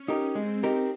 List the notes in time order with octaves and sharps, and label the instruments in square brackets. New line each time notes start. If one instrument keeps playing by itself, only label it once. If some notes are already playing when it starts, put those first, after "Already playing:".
Already playing: [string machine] C#4
[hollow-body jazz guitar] D#4 G4 A#4
[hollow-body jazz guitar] G#3 [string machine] C4
[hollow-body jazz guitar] D#4 G4 A#4